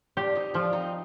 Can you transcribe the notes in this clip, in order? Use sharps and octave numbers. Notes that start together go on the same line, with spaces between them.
D4 F4 G4
C4 D#4
F3 D4 F4
C4 D#4